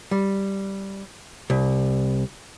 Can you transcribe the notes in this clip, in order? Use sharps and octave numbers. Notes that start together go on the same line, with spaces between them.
G3
C2